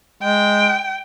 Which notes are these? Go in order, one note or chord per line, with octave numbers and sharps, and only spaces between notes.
G#3 G5